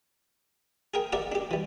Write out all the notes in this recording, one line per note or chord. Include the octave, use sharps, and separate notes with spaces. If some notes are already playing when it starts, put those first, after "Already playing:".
G#4 A#4 G5
G4 A#4 D5 E5 F#5
D4 G4
E3 G3